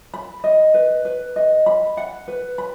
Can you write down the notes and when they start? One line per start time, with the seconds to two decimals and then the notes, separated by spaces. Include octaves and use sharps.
0.14 B5
0.44 D#5
0.74 B4
1.05 B4
1.36 D#5
1.66 B5
1.97 F#5
2.28 B4
2.58 B5